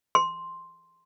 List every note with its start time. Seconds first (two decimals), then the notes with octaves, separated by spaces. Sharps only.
0.15 C6